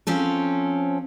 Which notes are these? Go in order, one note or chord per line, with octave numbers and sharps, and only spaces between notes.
F3 C4 C#4 A4